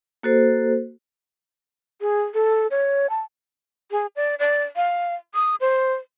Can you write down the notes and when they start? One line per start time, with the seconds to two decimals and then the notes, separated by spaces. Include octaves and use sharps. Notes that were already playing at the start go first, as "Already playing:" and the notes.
0.23 A#3 F#4 A4 C5
2.01 G#4
2.34 A4
2.71 C#5
3.10 A5
3.91 G#4
4.16 D5
4.39 D5
4.76 F5
5.35 D#6
5.61 C5